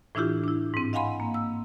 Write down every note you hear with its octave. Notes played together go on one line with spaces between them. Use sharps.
A2 E3 D4 E4 F4 G4
D4 E4
G#2 C4
D#5 F5 F#5 G#5 B5 C6
A#3
E6